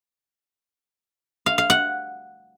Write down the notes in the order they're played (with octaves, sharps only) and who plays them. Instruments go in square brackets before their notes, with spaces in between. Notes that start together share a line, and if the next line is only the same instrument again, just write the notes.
[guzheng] F5
F5
F#5